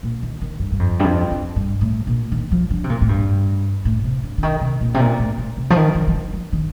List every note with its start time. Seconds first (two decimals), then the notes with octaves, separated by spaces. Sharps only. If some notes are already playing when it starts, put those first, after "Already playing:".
0.03 A#2
0.22 D#3
0.41 D#3
0.59 G2
0.72 G2
0.79 F2
1.00 G2
1.04 F2
1.31 F2
1.56 G2
1.81 A2
2.07 A#2
2.32 D#3
2.51 F3
2.70 D3
2.84 C3
2.90 A#2
3.01 A2
3.09 G2
3.85 A2
4.04 C3
4.23 D3
4.38 D3
4.43 D#3
4.61 C3
4.80 A#2
4.94 C3
5.00 A#2
5.19 A2
5.38 A2
5.57 C3
5.70 F3
5.76 D#3
5.95 F3
6.07 F3
6.14 D#3
6.33 F3
6.53 D#3